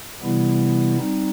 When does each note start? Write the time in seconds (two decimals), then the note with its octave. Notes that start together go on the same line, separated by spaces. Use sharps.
0.22 C3 E3 G3 B3 E4
0.98 G3 C4 D#4